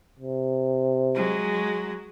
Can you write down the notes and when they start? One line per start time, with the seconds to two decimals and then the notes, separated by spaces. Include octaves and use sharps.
0.19 C3
1.15 F#3 G#3